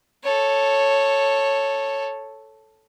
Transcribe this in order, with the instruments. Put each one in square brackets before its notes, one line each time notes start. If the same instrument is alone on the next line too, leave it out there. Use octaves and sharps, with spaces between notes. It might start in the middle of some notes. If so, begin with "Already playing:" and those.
[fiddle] A4 C#5